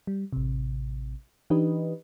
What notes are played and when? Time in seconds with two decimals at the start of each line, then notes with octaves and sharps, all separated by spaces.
0.07 G3
0.33 A1 C3
1.50 E3 D4 D#4 G4 B4 D#5